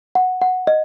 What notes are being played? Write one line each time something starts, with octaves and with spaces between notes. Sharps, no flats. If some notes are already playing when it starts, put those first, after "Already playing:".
F#5
F#5
D#5